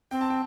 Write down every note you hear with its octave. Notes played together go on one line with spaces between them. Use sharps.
C4 G5
A5
G5